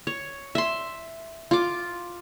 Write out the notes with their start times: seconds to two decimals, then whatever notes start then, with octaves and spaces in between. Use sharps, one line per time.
0.07 C#5
0.55 E5 C6
1.51 F4 D6